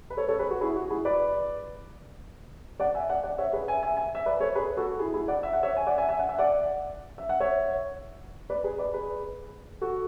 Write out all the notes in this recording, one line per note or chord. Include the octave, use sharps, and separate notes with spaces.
B4
A4 C#5
A4 C#5
G#4 B4
F#4
E4 G#4
F#4
E4 G#4
B4 D5
D5 F#5
E5 G#5
D5 F#5
D5 F#5
C#5 E5
G#4 B4
E5 G#5
E5 G#5
E5 G#5
E5
B4 D5
A4 C#5
G#4 B4
F#4 A4
E4 G#4
E4 G#4
D5 F#5
E5
F#5
C#5 E5
G#5
D5 F#5
E5 G#5
E5 G#5
F#5
E5
D5 F#5
E5
F#5
C#5 E5
B4 D5
G#4 B4
B4 D5
G#4 B4
F#4 A4